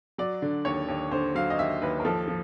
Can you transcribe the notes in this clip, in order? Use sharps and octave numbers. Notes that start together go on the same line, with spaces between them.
F#3 D5
D3
D#2 C#5
D#2
D3 C5
F#3 F5
D#5
D#2 E5
D#2 B4
A#4
F3 A4
F3